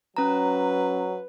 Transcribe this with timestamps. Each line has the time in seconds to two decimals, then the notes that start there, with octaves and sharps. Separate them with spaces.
0.17 F#3 C#4 B4 A#5